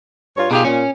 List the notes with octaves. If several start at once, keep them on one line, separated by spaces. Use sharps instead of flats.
G2 F4 C#5
B2 D#4 F4 G4 G#4
A#2 C#4